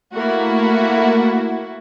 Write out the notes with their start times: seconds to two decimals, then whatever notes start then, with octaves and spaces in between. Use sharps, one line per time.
0.15 A3 A#3 E4 F#4